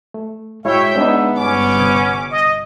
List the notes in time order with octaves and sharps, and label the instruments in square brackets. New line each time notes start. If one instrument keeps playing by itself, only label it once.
[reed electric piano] A3
[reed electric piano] G#3 E4 F#4 [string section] C#5 G5 [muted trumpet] E5
[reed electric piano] G#3 D#4 [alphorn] B3 [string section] D4
[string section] G1 D6 [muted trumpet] C#4
[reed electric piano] C3 D#6 G#6
[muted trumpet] D#5